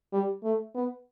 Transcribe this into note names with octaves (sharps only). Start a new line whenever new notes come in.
G3
A3
B3